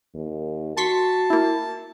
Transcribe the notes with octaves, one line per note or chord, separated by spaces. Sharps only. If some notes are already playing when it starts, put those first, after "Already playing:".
D#2
F#4 A5 C6 C#6 B6
A#3 E4